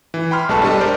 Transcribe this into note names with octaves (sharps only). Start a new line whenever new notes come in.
E3
G5 B5 C6 F6
B1 G#3 A4 B4 A5 C#6
G3 D4 G4 A4 D#5
A#4 C5 D5